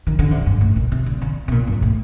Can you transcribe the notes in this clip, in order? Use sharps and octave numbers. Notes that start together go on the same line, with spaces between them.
D#3
D3
C3
G2
A2
A#2
C3
D3
D3
C3
A#2
G2
A2